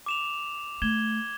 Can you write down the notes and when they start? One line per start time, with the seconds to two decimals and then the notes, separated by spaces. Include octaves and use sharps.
0.06 D6 E7 F7
0.82 A3 G#6 E7 G7